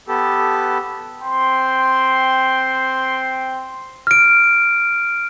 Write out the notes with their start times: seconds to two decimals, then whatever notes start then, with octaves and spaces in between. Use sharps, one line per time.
0.08 B3 G4 A4
1.21 C4 G5 C6
4.07 F6 D7